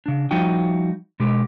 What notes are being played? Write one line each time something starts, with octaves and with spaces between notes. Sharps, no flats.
C#3 D4
F3 G3 D#4 F#4 G5
B2 G#3 G4